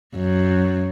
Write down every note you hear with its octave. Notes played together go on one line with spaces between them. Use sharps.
F#2